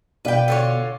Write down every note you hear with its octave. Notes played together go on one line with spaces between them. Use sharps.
B2 B4 D5 F5 G5
D3 F4 C#5